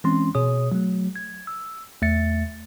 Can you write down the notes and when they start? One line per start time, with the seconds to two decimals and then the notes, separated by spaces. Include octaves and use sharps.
0.04 E3 G#3 C4 C#4 C6
0.35 B2 G#4 C#5 D#6
0.72 F#3 A3
1.16 G#6
1.47 E6
2.02 E2 A3 E5 A6 C#7